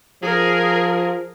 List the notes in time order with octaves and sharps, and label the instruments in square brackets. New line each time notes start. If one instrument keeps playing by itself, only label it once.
[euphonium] F3 [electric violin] G#4 A#4